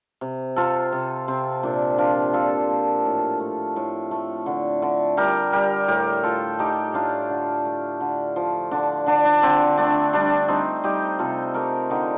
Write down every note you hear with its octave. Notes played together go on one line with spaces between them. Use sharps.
C3
C3 F4 A4
C3
C3 C4
A#2 D4
F3 D4 F4
A#2 F4 A4
A#2
A2
A3
A2
A3
D3
D3
G3 G4 A#4
G3 G4 A#4
A2 G4 A#4
A3 F4 A4
A3 D#4 G4
A2 D4 F4
D3
A3
D3
F3
D3 D4
D3 D4
D4
D3 C4
A3 D4
G3 D4
G3 C4 D#4
G3 D#4 G4
C3 F4 A4
A3 G4 A#4
D3 D#4 G4